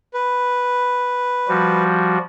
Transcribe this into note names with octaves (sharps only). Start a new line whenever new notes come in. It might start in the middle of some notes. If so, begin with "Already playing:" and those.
B4
F3 G3 F#4